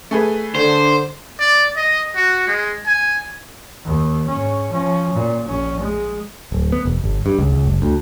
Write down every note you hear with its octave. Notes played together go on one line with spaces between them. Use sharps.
A3 G#4 B4
D3 C5
D5
D#5
F#4
G#3
G#5
D#2
G#2 C#4
F3 C#4
A#2
A#1 C#4
G#3
D1
B3
E1
G1
G2
C#2
C#2
F#1
D2